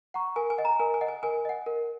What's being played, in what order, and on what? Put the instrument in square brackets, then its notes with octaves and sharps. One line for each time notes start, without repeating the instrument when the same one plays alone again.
[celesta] F#5 A#5 C#6
[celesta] A#4 [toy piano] G#5
[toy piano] G#5
[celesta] D#5 F#5
[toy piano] A#5
[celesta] A#4 [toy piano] G#5
[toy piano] G#5
[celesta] D#5 F#5
[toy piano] G#5
[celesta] A#4 [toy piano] G#5
[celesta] D#5 F#5
A#4